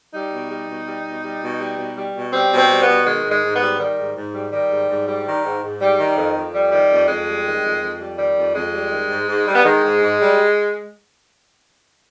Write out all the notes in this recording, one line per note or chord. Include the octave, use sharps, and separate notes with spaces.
G3 D#4
B2
G3
B2
G3
B2
G3
B2
G3
B2
G3
B2
G3 C4
B2
C4
G3
B3
B2
D#3 G#3
G#2
G#3
G#2
B3
G3
D#3 G3
G#2
G#2
G3
D#3 G3
G#2
G#2
G3
D#3
G#2
G#2
G3
D#3
F2
F2
G3
D#3 G3
F2
F2 G#3
G3
D#3
F2
F2
G3
D#3 G3
F2
F2 G#3
G3
D#3
G#2
G#2
G3
B3
D#3 G#3
G#2
G#2
G3